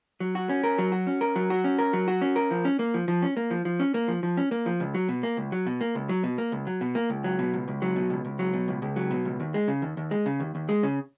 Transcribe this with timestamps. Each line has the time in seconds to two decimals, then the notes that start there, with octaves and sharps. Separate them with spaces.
0.20 F#3
0.35 F#4
0.49 C#4
0.64 A#4
0.78 F#3
0.92 F#4
1.07 C#4
1.21 A#4
1.36 F#3
1.50 F#4
1.64 C#4
1.79 A#4
1.93 F#3
2.08 F#4
2.21 C#4
2.36 A#4
2.51 F3
2.65 C#4
2.79 A#3
2.94 F3
3.08 F3
3.22 C#4
3.37 A#3
3.51 F3
3.65 F3
3.80 C#4
3.94 A#3
4.08 F3
4.23 F3
4.37 C#4
4.51 A#3
4.66 F3
4.80 C#2
4.94 F#3
5.09 B2
5.23 A#3
5.37 C#2
5.52 F#3
5.67 B2
5.81 A#3
5.95 C#2
6.09 F#3
6.24 B2
6.38 A#3
6.52 C#2
6.67 F#3
6.81 B2
6.95 A#3
7.10 C#2
7.24 F#3
7.39 B2
7.54 C#2
7.68 C#2
7.82 F#3
7.96 B2
8.10 C#2
8.25 C#2
8.39 F#3
8.53 B2
8.68 C#2
8.82 C#2
8.96 F#3
9.11 B2
9.25 C#2
9.40 D#2
9.54 G#3
9.68 C#3
9.82 D#2
9.97 D#2
10.11 G#3
10.26 C#3
10.40 D#2
10.55 D#2
10.69 G#3
10.83 C#3